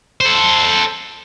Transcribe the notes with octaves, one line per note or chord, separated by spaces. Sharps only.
A4 C5